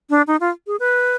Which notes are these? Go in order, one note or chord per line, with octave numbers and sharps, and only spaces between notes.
D4
D#4
F4
G#4
B4